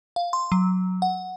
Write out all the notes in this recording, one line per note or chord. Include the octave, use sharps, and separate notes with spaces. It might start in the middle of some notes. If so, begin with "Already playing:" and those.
F5
C6
F#3
F#5